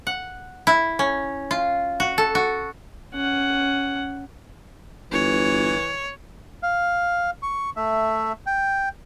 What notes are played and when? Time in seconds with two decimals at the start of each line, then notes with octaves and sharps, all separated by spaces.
0.07 F#5
0.67 E4
0.99 C#4
1.51 F4
2.00 F#4
2.18 A4
2.35 F#4
3.14 C#4 F#5
5.12 G1 E3 C#5
6.63 F5
7.42 C#6
7.76 A3 E5
8.47 G5